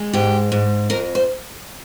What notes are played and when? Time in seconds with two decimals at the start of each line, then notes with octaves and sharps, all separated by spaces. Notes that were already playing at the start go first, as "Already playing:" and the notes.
Already playing: G#3
0.13 G#2 G4
0.52 G#2
0.90 F2 A#4
1.15 C5